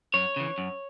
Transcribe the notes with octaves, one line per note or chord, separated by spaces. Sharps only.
F#2 C#5
C#3 E3
F#2